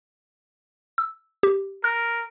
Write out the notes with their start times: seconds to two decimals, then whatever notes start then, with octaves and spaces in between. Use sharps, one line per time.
0.98 E6
1.43 G4
1.84 A#4 F6